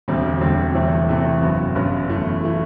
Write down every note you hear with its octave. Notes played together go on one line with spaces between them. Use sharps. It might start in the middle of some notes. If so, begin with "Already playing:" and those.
E1 D2 D3 G3 C4
E1 D2 D3 G3 C4
E2 C3 E3 A3 C4
E2 C3 E3 A3 C4
G1 F#2 F#3 B3
G1 F#2 F#3 B3
F#2 E3 A3
E3 A3